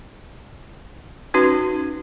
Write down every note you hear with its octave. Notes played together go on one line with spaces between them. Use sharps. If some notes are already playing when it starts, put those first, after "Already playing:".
C#4 D#4 F#4 B4